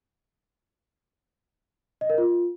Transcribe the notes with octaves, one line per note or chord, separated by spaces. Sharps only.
D#5
A#4
F4